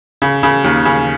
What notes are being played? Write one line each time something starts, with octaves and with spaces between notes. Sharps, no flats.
C#3
C#3
D#2
C#3